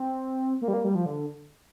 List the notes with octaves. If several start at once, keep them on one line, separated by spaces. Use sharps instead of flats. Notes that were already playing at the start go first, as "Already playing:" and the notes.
Already playing: C4
A#3
G3
A#3
G3
F3
D3